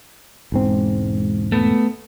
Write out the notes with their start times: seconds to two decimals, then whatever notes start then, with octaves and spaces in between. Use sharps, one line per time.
0.52 E1 G#2 C4
1.52 A3 B3